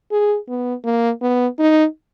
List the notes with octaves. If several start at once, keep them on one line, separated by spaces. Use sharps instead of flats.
G#4
B3
A#3
B3
D#4